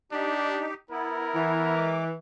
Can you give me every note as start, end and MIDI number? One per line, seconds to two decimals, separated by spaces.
0.12 0.70 62
0.12 0.74 63
0.12 0.74 67
0.90 1.75 59
0.90 1.75 64
0.90 2.03 70
1.35 2.12 52
1.76 2.04 56
1.76 2.04 86